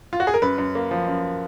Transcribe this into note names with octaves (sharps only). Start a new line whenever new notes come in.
F4
F#4
G#4
A#4
F#2 B4
F#2
A#3
F3
F#2